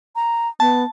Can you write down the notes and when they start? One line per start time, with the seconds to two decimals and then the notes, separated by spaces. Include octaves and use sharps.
0.16 A#5
0.60 B3 A5